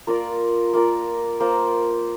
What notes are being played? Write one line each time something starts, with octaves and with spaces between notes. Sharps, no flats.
A#3 F4 A#4 D5
A#3 F4 A#4 D5
A#3 F4 C5